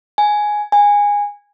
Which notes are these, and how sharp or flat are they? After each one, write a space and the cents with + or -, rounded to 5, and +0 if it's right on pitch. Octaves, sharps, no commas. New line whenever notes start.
G#5 +5
G#5 -15